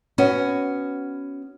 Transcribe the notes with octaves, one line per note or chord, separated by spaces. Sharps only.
B3 C#4 F#4